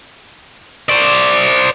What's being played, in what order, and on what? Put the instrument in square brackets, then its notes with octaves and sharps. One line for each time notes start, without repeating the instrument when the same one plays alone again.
[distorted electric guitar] C5 D5